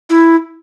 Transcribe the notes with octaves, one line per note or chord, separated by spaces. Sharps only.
E4